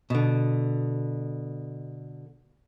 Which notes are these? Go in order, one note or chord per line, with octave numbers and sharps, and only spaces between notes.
B2 D3